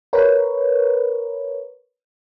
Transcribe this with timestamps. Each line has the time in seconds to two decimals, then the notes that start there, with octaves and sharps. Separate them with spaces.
0.13 A#4 B4 C#5